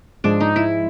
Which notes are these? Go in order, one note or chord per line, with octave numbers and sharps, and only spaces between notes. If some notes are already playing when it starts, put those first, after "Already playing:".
G#2 F3 G#3 D4
D#4
E4